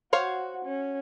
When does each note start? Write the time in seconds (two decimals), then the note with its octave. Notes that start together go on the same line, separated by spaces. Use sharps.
0.13 F#4 C5 C#5 F5
0.65 C#4